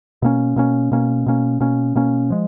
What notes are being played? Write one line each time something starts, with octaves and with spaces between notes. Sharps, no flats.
B2 A#3 C#4
B2 A#3 C#4
B2 A#3 C#4
B2 A#3 C#4
B2 A#3 C#4
B2 A#3 C#4
F3 G#3